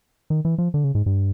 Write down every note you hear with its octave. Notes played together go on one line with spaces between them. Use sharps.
D#3
E3
F3
D3
C#3
G#2
G2